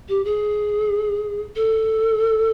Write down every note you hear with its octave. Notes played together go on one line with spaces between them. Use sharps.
G4
G#4
A4